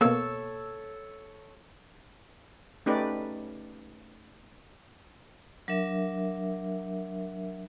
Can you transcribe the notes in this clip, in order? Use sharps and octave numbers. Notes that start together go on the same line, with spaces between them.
B2 A#3 A4 C#5 E6
A3 C#4 D#4 G4 B4 D5
F#3 D4 A#4 E5